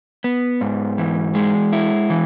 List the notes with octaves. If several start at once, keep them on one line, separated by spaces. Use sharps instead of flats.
B3
G#2
E3
G#3
E4
E3